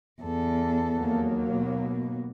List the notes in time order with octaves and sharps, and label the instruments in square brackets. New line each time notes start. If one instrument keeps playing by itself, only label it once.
[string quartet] E2 A4
[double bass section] D#2 F#3 A#3
[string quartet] B2